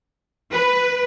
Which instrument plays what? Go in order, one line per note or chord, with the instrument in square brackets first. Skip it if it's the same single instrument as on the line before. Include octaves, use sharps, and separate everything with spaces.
[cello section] B4